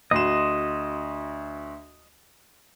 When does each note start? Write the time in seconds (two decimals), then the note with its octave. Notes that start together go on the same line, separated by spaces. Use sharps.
0.11 D2 F#4 D#5 C6 E7